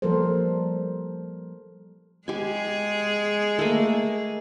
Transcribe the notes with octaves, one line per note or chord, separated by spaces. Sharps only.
F3 G3 A#3 A4 A#4 C5
G#3 G4 G#4 G#5
A3 A#3